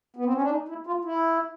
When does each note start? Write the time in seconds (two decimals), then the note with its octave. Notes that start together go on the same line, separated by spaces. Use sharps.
0.16 B3
0.25 C4
0.34 C#4
0.42 D4
0.50 D#4
0.68 E4
0.87 F4
1.05 E4